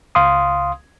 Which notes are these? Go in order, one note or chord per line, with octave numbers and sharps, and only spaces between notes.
C#2 F5 C6 D#6